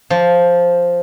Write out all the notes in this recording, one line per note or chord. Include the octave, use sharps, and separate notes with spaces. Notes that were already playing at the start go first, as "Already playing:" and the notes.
F3